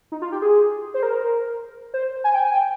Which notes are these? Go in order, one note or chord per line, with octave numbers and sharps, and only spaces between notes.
D#4
F4
G4
G#4
C5
A#4
C5
G#5
G5
G#5
G5